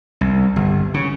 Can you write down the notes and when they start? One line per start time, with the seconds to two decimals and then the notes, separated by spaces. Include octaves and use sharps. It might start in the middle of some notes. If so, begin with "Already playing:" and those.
0.21 C2
0.56 G1
0.94 C#3